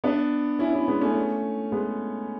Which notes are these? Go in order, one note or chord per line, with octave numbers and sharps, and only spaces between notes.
B3 D4
C#4 E4
C#4 E4
G#3 B3
A3 C#4
G#3 B3